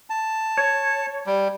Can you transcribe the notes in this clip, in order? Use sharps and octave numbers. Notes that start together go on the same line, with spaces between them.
A5
C#5
G3